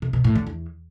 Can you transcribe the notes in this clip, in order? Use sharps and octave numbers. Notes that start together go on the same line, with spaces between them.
C3
B2
A2
D3
E2